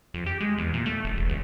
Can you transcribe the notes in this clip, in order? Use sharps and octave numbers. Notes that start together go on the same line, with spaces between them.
F2
G4
G#3
E2
A#2
A3
F#1
E1
C#2